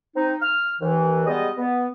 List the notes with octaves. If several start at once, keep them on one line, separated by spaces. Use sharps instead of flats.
C4 D#4
F6
D#2 E3
G3 G#3 B3 D#5
B3